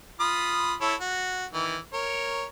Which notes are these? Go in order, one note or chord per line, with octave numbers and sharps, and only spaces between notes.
F4 B5 D#6
E4 A4 C#5
F#4
D#3 E3
A#4 C#5